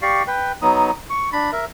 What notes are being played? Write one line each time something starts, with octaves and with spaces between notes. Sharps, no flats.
G4 D5 F5 C#6
B4 G5
F#3 B3 D#4 D#6
C#6
D4 B5
A#4 E5